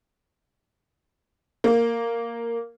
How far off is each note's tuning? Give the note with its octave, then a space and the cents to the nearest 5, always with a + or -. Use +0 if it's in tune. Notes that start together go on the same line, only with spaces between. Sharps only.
A#3 -5